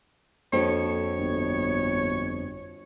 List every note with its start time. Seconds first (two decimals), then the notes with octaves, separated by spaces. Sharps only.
0.53 F2 A#3 D4 F#4 A4 C#5
1.19 G1